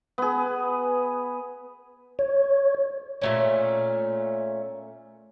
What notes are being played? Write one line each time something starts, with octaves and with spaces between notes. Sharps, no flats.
B3 G#4
C#5
A#2 A3 C#4